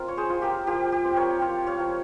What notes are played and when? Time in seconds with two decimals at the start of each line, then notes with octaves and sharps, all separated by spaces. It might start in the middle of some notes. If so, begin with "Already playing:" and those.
Already playing: C4 F4 A#4
0.08 C#5
0.17 G#4 C5
0.30 F4
0.42 G4 A#4
0.67 F3 G4
0.92 G4
1.04 C4
1.17 A#4 C#5
1.42 F4
1.67 C#5 F5
1.80 F3